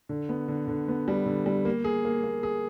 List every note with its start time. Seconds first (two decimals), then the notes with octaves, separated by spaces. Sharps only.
0.09 D3
0.29 B3
0.48 D3
0.68 D3
0.88 B3
1.08 G3
1.26 D3
1.46 G3
1.65 A#3
1.84 G#4
2.05 A#3
2.23 A#3
2.43 G#4